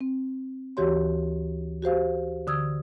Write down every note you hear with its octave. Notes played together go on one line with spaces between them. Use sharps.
C4
D2 E3 F#4 G4 C#5 C6
F#4 G4 C5 F5
D3 D#6 E6 G#6